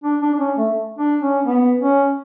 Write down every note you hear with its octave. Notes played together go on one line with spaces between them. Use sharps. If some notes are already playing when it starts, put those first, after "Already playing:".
D4
D4
D4
C#4
A3
D4
C#4
B3
C#4